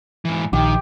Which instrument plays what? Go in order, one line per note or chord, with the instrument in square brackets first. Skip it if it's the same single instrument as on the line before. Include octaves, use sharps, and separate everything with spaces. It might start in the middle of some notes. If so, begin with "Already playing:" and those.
[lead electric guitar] G#2 E3
[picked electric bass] A#1 [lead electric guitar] D#3 [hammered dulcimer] G4